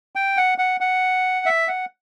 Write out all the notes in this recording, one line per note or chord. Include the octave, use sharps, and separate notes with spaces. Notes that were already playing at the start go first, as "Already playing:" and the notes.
G5
F#5
F#5
F#5
E5
F#5